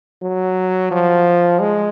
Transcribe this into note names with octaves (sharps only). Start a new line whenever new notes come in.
F#3
F3
G#3